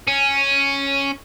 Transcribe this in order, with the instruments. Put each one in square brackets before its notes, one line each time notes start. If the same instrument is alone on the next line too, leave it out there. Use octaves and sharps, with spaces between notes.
[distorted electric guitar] C#4